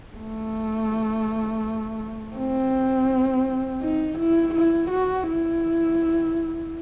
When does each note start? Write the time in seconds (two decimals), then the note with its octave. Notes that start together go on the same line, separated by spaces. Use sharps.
0.17 A3
2.36 C4
3.82 D#4
4.18 E4
4.54 E4
4.90 F#4
5.28 E4